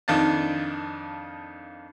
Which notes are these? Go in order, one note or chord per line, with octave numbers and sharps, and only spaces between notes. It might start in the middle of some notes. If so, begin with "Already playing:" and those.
F2 D#3 D4 F4 A5